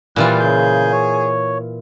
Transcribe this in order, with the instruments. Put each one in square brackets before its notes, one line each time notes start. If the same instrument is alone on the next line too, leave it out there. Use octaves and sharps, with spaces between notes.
[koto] A#2 E3 F4 [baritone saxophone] G3 [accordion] F#6
[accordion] C#3 G6 [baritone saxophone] G#4
[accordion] C#5